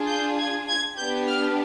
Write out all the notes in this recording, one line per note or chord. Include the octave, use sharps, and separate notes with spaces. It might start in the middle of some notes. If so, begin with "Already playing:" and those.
Already playing: D4 F4 G#4
G6
G#6
G#6
B3 D4 G4 G6
F6